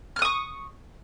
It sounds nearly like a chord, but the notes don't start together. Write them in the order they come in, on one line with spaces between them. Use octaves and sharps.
F6 F#6 D#6 C#6